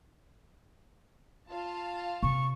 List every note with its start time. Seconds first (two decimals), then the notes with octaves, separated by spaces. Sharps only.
1.50 F4 F5 A5
2.23 C3 C#6